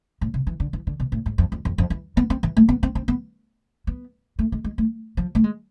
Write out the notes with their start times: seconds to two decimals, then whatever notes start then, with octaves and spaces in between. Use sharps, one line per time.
0.21 A2
0.34 C3
0.47 E3
0.60 D3
0.73 E3
0.87 D3
1.00 B2
1.12 A2
1.26 G#2
1.38 F2
1.52 F2
1.65 F2
1.78 F2
1.90 E3
2.17 B3
2.30 C4
2.43 E3
2.57 A3
2.69 B3
2.83 C4
2.95 C4
3.08 B3
3.87 B3
4.39 A3
4.52 G#3
4.64 G#3
4.78 A3
5.17 F3
5.35 A3
5.44 G#3